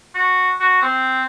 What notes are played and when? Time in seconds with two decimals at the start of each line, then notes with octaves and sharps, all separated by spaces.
0.15 F#4
0.60 F#4
0.82 C4